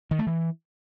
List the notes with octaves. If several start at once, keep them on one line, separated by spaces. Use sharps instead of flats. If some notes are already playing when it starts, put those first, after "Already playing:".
D#3
A3
E3